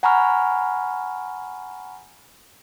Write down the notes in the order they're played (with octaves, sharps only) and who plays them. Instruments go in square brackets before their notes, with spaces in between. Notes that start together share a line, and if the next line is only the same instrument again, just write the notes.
[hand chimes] F#5 G#5 A#5 B5 C#6 F6